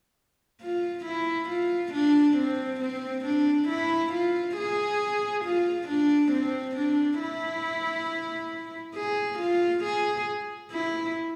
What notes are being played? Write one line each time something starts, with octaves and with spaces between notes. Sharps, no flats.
F4
E4
F4
D4
C4
C4
D4
E4
F4
G#4
F4
D4
C4
D4
E4
G#4
F4
G#4
E4